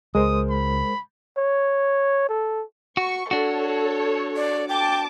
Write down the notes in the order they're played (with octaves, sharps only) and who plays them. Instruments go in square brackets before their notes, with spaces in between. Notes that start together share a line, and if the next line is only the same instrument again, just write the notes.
[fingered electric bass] C#2 [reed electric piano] G#3 A#4 C5 [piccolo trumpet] D#6
[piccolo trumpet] B5
[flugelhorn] C#5
A4
[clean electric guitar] F#4 [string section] C#6
[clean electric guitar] D4 F#4 [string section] A4 C#5
[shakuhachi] D5
[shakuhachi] G5 [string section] A5 D6